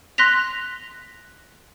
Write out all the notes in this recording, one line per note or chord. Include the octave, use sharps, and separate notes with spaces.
C6 F#6 A#6 B6 F7